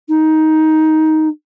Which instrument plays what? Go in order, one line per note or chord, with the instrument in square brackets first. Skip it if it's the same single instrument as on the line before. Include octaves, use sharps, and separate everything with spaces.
[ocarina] D#4